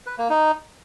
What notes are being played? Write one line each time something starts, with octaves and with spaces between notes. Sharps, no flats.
B4
A#3
D#4